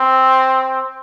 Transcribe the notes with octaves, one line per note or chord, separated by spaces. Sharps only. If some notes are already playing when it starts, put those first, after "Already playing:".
Already playing: C4